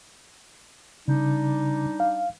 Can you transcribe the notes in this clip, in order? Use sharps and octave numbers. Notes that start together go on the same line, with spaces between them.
C#3 G3 D4 D#4
F5